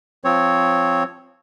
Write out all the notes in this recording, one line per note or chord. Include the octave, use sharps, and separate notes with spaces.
F3 C4 C#5